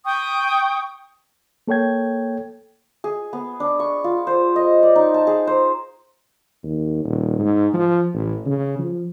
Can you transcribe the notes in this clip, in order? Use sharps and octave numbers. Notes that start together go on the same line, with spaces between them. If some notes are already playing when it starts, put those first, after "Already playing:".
G5 C#6 D#6
A#3 A4 C#5 G5 G#6
G#4
B3
D4
C#6
F4
C5
D#5
D5
D#4
A5
G#4
C5
D#2
D#1
G#2
F3
A1
C#3
F3